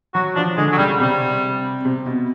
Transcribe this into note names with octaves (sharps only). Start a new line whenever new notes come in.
F#3 F#4
F3 D4
D3 G#3
F#3
C#3 G3
C3 G3
C3
B2